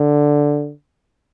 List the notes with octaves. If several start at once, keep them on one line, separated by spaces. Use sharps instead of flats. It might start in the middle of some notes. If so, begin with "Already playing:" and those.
Already playing: D3